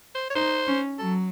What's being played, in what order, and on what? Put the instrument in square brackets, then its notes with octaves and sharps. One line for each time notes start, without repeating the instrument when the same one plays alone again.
[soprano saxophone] C5
C#5
[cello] D#4 [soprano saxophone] C5
[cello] C#4
[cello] F#3 [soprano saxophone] A4